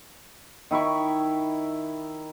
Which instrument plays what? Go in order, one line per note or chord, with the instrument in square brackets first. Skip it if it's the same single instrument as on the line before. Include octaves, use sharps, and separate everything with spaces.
[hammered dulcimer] D#3 E4 B5 C#6